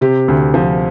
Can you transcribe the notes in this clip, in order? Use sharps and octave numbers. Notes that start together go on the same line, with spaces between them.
C3 G4
D2
F3